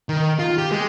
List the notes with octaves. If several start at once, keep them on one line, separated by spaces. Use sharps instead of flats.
D#3
F4
G4
G#3